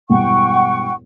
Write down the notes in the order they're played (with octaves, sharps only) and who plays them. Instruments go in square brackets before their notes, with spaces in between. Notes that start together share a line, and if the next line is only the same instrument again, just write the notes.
[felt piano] E1 E2 G2 [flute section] F#5 G5 C#6